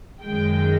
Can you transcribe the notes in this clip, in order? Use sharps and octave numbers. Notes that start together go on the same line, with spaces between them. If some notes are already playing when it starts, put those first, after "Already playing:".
F#2 D#3 G#3 G5